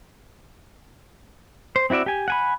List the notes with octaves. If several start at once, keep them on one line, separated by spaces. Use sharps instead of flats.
C5
C4 E4 F#4 D5 E5
G4 G#5
F#5 G#5 B5